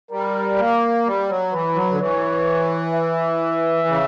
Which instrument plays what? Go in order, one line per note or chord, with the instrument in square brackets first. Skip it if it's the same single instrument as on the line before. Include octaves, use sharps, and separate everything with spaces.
[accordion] G3 [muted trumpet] A#4
[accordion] A#3
G3
F#3
[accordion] E3 [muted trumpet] B4
[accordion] F#3
D3
[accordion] E3 [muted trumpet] C#5
[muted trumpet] E5
[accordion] C#3